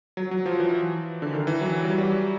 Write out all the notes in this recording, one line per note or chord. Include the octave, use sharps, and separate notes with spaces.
F#3
F#3
F3
E3
D3
D#3
E3
F#3
G3
F#3
G3